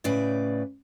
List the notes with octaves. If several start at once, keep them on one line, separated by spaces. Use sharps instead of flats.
A2 C#3 B4 D5